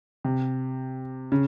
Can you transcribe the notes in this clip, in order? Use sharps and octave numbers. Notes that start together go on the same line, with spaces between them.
C3
C#3